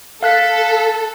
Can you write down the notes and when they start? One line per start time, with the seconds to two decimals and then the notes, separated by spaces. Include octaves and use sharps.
0.23 A4 F5 F#6 B6